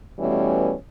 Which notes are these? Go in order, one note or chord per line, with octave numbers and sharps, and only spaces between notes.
B2 E3 G3 A3 C#4